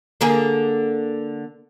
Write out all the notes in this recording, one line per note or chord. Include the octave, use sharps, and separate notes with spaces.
D3 A#3 G#4